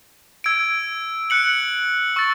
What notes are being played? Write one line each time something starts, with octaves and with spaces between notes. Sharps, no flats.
E6 G#6 D7
F#6 C#7 F#7
C#6 E6 A6